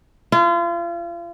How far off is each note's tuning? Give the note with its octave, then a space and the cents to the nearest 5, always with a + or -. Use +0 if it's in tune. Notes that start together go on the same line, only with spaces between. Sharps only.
F4 -35